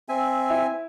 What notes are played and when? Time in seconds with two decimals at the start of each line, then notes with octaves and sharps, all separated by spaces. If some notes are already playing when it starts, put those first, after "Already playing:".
0.09 C4 E5 G#5
0.50 E4